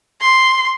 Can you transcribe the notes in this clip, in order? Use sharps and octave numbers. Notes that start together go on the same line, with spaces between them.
C6